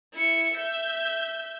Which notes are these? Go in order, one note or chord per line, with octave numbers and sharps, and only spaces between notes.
E4 C#7
E5 G6